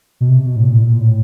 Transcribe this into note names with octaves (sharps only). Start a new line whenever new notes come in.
B2
C3
B2
A2
A#2
A2
A#2
A2